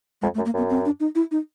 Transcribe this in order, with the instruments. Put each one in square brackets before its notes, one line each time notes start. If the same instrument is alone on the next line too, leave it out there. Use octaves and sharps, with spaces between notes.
[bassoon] F2 [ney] G#3
[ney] A3
[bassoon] F#2
[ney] A#3
[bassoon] F#2 [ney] B3
[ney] C4
D4
D#4
E4
D#4